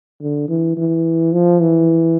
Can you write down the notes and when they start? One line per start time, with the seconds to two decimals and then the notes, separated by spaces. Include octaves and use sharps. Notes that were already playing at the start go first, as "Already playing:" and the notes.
0.21 D3
0.48 E3
0.77 E3
1.33 F3
1.61 E3